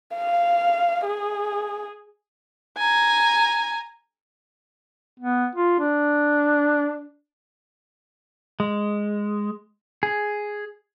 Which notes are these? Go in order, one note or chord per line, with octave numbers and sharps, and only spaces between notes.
F5
G#4
G#5 A#5
B3
F4
D4
G#3
G#4